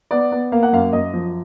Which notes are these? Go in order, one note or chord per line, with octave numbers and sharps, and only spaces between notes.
B3 D5
B3
A#3 F5
F#5
F#2 F5
F#2 D#5
F3